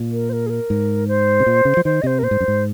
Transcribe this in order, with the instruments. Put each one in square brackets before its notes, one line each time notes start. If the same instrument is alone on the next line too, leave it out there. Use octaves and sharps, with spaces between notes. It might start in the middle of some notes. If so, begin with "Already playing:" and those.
Already playing: [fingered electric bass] A#2
[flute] A#4
C5
A#4
G#4
A#4
[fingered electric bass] G#2
[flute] C5
[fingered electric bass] C3
A#2
C#3
F3
[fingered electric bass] D#3 [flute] C5
[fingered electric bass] C3 [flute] C5 D#5
[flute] A#4
[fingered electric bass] A#2 [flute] C5
[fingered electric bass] G#2
F#2
G#2